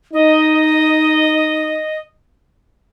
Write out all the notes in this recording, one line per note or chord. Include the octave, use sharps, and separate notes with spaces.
D#4 D#5